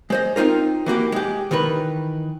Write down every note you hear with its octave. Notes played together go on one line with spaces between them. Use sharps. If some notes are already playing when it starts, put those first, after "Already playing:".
G#3 C5 D#5
C4 C#4 D#4 F4 A#4
E3 A#3 F#4 G4
G#3 G4
D#3 E3 A#4 B4